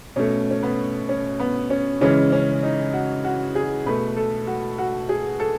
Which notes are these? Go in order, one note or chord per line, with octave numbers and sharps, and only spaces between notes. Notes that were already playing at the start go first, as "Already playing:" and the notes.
B2 A3 C#4
C#4
B3
C#4
B3
C#4
C#3 E3 G#3 C#4
C#4
D#4
F#4
F#4
G#4
B2 A3 B4
A4
F#4
F#4
G#4
A4